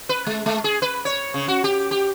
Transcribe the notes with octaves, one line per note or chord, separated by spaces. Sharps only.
B4
G#3
G#3
G#4
B4
C#5
C#3
F#4
G4
G4